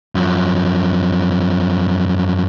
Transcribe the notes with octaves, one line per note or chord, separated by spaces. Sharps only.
F#2 F3